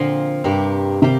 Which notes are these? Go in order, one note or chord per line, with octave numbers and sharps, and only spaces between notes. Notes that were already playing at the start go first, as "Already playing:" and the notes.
Already playing: A#2 D3 F3 C4
G2 C3 A#3 G4
C3 G3 A#3 G4